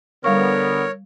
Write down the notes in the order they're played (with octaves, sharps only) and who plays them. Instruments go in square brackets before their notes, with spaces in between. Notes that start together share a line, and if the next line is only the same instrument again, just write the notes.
[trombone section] D3 B3 [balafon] G3 F5 C#6 [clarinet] A#4 [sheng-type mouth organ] C#5